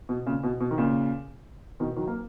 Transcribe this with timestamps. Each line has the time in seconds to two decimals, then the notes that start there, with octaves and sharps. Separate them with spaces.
0.09 B2
0.26 A#2 C#3
0.43 B2
0.60 B2
0.71 D#3
0.78 A#2 C#3
1.80 B2 D#3
1.96 D#3 F#3
2.07 A#3